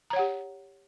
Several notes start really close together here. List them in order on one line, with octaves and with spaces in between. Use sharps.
A#5 C#5 F#5 G4